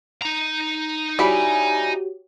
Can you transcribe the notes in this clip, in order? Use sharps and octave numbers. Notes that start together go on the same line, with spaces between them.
D#4 A#5
G3 E4 F#4 G4 C#5 G#5 B5